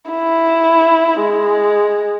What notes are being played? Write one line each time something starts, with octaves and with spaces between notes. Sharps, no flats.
E4
G#3